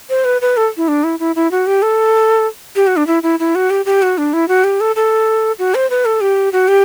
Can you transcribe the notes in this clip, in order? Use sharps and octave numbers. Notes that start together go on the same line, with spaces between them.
C5
B4
B4
A4
E4
D4
E4
E4
E4
F#4
G4
A4
G4
F#4
D4
E4
E4
E4
F#4
G4
G4
F#4
D4
E4
F#4
G4
A4
A4
F#4
C5
B4
A4
G4
F#4
G4